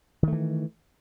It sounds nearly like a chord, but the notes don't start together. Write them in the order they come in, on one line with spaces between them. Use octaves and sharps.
D#3 A3 E3